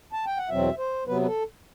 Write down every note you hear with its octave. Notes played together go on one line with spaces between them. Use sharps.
A5
G5
F#5
E2 B2 F#3 C4 E5
C5
C3 F#3 B3 B4
B4
A4